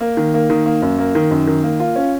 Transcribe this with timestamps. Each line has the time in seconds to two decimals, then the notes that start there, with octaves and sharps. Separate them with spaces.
0.01 A#3
0.17 D#3
0.34 A#3
0.50 D#3
0.66 A#3
0.82 F#2
0.99 A#3
1.15 D#3
1.31 F#2
1.47 D#3
1.63 A#3
1.80 F4
1.96 C#4